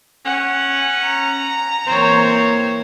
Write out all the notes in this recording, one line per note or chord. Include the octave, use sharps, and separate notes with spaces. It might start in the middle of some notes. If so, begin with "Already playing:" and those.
C#4 F#5
A#5
E3 A#3 C4 C5 C#5